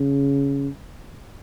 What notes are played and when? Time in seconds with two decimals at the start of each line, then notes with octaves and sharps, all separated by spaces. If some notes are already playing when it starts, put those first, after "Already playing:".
Already playing: C#3